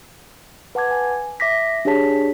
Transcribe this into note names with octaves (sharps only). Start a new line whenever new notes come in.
B4 F#5 A5 D6 G#6
G#5
E5 D6 A#6 B6
D4 G4 G#4 C#5 A5 B6